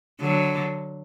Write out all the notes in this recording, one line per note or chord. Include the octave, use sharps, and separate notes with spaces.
D3 F#3